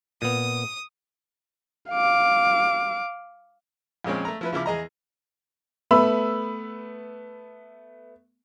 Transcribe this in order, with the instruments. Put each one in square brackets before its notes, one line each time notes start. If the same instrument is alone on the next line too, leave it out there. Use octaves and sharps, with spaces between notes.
[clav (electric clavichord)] A#2 B3 [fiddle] D#6
[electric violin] F5 D6
[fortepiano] F2 A#2 G#3 C4 C#4
A3 A#5
F3 E4 B4
C#3 F3 E4 D6
E2 G#4 D#5 A#5
[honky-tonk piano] A3 B3 B5 E6